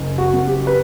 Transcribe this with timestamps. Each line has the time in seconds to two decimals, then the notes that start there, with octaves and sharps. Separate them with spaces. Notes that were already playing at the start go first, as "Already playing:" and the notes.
Already playing: F#1 F#2
0.18 F#4
0.33 F#2
0.48 G4
0.67 B4